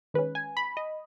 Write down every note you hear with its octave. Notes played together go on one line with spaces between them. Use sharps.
D#3 G#3 C#4 B4
G#5
B5
D#5